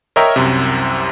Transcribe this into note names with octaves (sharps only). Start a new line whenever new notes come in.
A#4 C#5 D#5 E5 G5 A#5
C2 F#2 C3